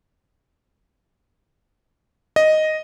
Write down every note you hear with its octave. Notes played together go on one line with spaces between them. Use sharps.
D#5